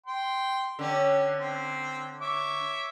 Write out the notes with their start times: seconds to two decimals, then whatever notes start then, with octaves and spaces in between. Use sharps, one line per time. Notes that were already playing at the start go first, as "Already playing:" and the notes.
0.06 G5 C6
0.79 D3 C#4 G4
1.36 C4
2.20 C#5 E5 D6